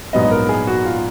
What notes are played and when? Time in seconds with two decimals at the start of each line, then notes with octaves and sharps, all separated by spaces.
0.13 A#1 G#2 F#3 B3 D#5
0.31 A#4
0.49 G#4
0.67 F#4
0.85 F4